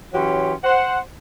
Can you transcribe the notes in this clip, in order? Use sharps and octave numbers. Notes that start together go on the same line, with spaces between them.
E3 F#3 C#4 G4 C#5 C6
C5 F#5